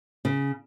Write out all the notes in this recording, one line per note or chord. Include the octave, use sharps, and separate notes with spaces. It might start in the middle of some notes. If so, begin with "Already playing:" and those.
C#3